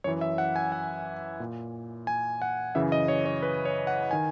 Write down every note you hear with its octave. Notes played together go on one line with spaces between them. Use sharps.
F#2 E3 C#5
E5
F#5
G#5
F#5
A#2
G#5
F#5
F#2 C#3 E3 E5
D#5
C#5
C#5
B4
C#5
F#5
D#3 G#5